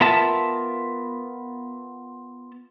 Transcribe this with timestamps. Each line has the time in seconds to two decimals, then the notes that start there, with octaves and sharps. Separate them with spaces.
0.01 B3 F4 A#4 E5 A5